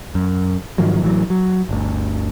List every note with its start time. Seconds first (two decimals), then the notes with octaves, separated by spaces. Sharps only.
0.15 F#2
0.78 G#2 D#3 F3 F#3
1.02 A1 E3 F#3
1.30 F#3
1.69 G1 D2